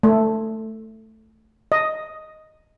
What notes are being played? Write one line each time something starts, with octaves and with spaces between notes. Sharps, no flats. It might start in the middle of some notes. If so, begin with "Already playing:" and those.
A3
D#5